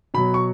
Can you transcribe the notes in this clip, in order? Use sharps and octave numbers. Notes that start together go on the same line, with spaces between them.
B2 F#3 B5
C#6